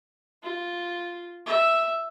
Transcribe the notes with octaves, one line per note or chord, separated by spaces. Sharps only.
F4
E5